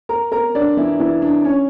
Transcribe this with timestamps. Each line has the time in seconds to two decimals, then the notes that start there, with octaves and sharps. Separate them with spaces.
0.09 A#4 A#5
0.32 A#4 A#5
0.55 D4 D5
0.77 E3 E4
1.00 E3 E4
1.22 D4
1.45 C#4